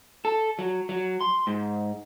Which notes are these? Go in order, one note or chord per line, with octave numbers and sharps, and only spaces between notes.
A4
F#3
F#3
C6
G#2